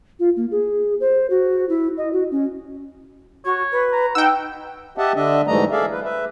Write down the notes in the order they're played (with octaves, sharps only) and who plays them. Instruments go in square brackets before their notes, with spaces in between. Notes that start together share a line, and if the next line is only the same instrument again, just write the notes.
[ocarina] F4
A#3
G#4
C5
F#4
E4
D#5
F#4
C#4
[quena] F#4 [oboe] C#5
[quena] B4
[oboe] A#5
[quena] D#4 [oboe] F#5 [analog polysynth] G5 E6
[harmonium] G4 D#5 E5 F#5 A5
D3 D4 D#5 E5
G#2 E3 G3 A3 D#5 A#5
G#4 A4 D5 E5 F5
B4
B4 E5